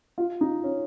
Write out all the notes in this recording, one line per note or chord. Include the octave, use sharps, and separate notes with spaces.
F4
D#4
C#4